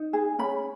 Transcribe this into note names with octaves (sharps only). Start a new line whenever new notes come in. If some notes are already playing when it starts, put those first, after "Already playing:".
Already playing: D#4
G#4
C#4 B5